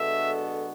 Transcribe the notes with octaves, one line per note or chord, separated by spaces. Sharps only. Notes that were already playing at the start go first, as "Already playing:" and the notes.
Already playing: D3 G#3 B3 F#4 A4 E5